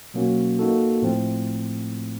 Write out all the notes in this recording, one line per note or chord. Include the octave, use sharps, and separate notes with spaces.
B2 F#3 A#3 C#4 F#4
A#3 D#4 F#4 A4
A2 F3 A3 C4